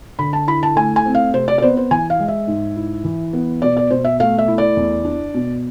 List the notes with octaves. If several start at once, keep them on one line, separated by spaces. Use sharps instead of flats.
D3 B5
A5
E4 B5
A5
A3 G#5
G#5
C4
F5
C3 C5
D5
D5
B3 C5
C5
E3 G#5
F5
G#3
E5
G#2
E4
E3
B3
B2 D5
D5
B2 C5
E5
A3 F5
E5
E4
D5
E2
D4
B2